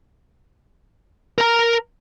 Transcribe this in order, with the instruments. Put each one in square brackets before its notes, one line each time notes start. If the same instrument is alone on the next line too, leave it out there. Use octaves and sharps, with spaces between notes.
[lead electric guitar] A#4 A#5